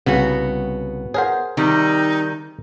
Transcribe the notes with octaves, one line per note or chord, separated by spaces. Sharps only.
C2 C#3 B3 F#4
G#4 A#4 C5 C#5 F#5
C3 D#3 G3 D#4